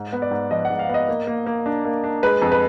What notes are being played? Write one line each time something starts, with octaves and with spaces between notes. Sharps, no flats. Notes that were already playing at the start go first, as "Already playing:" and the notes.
Already playing: G#2
B3
D5
G#2
F3 D#5
F#5
G#2
F5
B3
D#5
A#3
A#3
A#3
D4
A#3
D4
G#3 B4
F2
B4